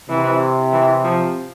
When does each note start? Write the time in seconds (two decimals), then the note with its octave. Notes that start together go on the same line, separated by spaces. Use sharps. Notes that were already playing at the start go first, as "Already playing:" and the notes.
0.09 C3 E3
0.73 E3
1.05 F3